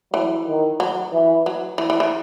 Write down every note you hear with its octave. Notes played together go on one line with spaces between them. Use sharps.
E3 F#3
D#3
F#3
E3
F#3
E3
E3
E3